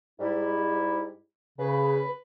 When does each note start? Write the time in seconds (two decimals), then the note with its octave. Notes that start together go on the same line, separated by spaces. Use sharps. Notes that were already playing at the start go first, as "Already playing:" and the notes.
0.20 G#2 G3 E4
1.59 C#3 B4